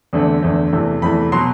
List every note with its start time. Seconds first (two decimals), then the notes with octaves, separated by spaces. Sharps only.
0.13 E2 D3 A3 C4
0.43 E2 D3 A3 C4
0.73 E2 C3 E3 A3
1.02 E2 C3 E3 A3 B5
1.32 B2 F#3 C6